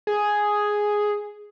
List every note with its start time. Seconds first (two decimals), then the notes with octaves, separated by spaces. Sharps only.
0.07 G#4